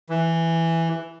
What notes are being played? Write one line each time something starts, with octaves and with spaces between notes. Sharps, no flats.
E3